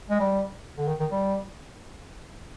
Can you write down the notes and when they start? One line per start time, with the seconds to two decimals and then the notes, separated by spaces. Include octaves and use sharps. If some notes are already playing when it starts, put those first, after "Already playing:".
0.10 G#3
0.20 G3
0.78 D3
0.88 D#3
1.00 D#3
1.12 G3